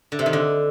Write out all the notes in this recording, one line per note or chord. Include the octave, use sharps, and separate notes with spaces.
D3
C3
D#3
D3